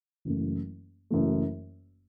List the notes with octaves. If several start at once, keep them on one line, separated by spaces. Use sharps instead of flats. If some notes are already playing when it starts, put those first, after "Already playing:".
F#1 F#2 E3 A3
F#1 F#2 E3 A3